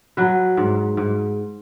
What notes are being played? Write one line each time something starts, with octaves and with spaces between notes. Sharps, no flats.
F#3 B4
G#2
G#2